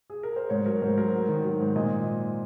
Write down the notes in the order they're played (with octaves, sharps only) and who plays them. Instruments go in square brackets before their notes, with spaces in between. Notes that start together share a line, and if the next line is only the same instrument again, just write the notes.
[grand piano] G#4
A#4
C5
G#2 C#5
F#3 A#4
G#2 C5
F#3 A#4
G#2
D#3
F#3
G#2
A#2 D#5